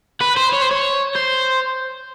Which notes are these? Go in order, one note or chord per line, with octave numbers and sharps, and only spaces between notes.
B4
C5
C#5
C5
C#5
C5